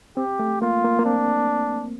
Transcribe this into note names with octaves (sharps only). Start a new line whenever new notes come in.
C4 G4
A3
A#3 F4
A#3
A#3
C4 D4